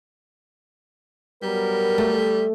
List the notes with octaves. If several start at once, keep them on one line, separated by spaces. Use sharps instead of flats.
F#3 G3 B3 A#4
A3